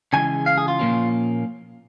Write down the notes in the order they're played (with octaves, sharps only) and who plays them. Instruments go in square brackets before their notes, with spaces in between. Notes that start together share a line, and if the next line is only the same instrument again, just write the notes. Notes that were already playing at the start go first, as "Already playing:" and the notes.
[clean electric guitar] C#3 E3 G#3 G#5
F5
G#4
F4
A#2 F3 A#3 C#4